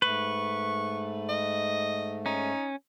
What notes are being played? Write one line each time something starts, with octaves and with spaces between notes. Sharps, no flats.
G#2 A3 B4 C#6
D#5
C#4 D#4